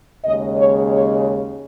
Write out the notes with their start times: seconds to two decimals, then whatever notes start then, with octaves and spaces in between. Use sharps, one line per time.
0.25 D#2 C#3 G#3 D#5
0.58 C#5
0.93 C#5